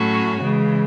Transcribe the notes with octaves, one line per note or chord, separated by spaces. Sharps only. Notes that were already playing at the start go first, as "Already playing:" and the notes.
Already playing: A2 F#3 C#4 F#4
C#3 E3 G#3